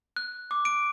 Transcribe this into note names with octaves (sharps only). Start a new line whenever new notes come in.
F#6
D6
D7